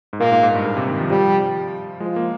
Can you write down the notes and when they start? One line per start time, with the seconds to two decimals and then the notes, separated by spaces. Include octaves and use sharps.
0.13 G#2
0.20 A#2 A#3
0.31 G#2
0.43 G#2
0.54 G2
0.65 G#2
0.77 C3
0.88 D#3
1.00 F3
1.10 F3 G3
2.00 F3 G#3
2.16 A#3